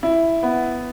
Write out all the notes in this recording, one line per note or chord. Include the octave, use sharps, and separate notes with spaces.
E4
B3